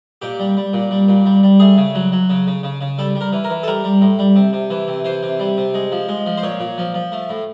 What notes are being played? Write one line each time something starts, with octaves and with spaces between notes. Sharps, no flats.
A#2 G4
G3
G3
A#2
G3
A#2
G3
G3
A3 G#4
C#3
F#3
F#3
C#3
C#3
C#3
C#3
G3 A4
G3
A#4
E3
A#4
E3
A4
G3 A#4
G3
A2
G3
C3
C3
E3
C3
E3 C5
C3
G3
C3
G#3
F3
G#3
F3
C5
A#2 C#5
A#2
F3
F3
A3
A2